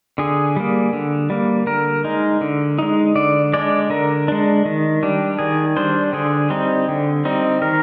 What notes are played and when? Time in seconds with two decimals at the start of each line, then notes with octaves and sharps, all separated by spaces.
0.18 D3 G#4
0.56 G3 A#3
0.93 D3
1.30 G3 A#3
1.67 D3 A#4
2.05 G#3 D#4
2.41 D3
2.79 G#3 D#4
3.15 D3 D5
3.53 G#3 D4 D5
3.90 D3 A#4
4.28 G#3 D4
4.65 D#3
5.03 G3 D4
5.39 D#3 G#4
5.76 G3 D4 C5
6.13 D3 G#4
6.50 G3 C4 D#4
6.88 D3
7.25 G3 C4 D#4
7.62 D#3 A#4